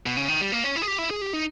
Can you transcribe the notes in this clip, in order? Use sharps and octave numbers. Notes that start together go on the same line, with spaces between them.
B2
C#3
D#3
G3
A#3
C#4
E4
G#4
G4
E4
G#4
G4
D#4